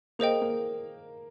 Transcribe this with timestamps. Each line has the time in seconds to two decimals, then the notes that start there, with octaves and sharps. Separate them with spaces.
0.19 A#3 G#4 C5 D#5 G5
0.42 A#3